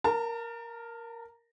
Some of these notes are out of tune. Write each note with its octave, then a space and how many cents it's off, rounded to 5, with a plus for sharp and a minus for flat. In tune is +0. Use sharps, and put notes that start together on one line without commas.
A#4 +0 A5 +35